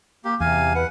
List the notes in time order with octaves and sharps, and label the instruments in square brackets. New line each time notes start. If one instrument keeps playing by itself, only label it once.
[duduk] A#3 [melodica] G4
[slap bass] E2 [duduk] C3 [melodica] F5 G#5
[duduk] B4 [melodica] F#5